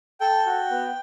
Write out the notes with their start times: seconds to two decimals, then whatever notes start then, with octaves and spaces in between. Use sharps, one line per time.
0.20 A4 G5
0.46 F#4
0.70 B3